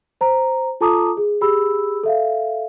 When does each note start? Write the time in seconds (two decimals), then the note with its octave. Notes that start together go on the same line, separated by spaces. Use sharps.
0.21 C5 A#5
0.81 F4 A4 A5 A#5 D6 D#6
1.17 G#4
1.41 G4 G#4 B5 E6
2.03 A4 E5 F5